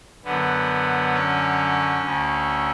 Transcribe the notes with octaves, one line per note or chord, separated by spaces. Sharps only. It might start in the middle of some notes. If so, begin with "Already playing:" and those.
F#2 D3 B3
C#4
D2 D3